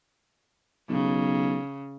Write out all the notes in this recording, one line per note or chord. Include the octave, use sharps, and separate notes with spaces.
B1 C#3